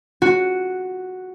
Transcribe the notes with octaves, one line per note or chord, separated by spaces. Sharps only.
F#4